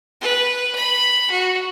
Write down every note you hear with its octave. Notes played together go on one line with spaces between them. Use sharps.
B4
B5
F#4